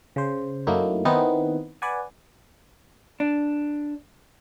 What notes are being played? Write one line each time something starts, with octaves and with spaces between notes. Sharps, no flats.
C#3 C5
F#2 F#3 A3 A#3 D#4 E4
D#3 B3 C4 D#4 E4 B4
B4 D5 F#5 G#5
D4